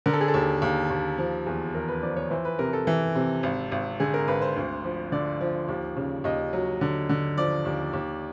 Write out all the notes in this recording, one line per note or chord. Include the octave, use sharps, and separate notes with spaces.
D3 A#4
A4
G#4
A4
D#2
D#2
D#2
F3
E2
E2 A#4
B4
F3 D5
C#5
E3 C5
B4
C3 A#4
A4
E3
C3
G#1
G#1
D3 G#4
A#4
G#1 B4
C5
D2
F3
D3 D5
F3
D#2
C#3
D#2 D#5
F#3
D3
D3
F3 D5
D#2
D#2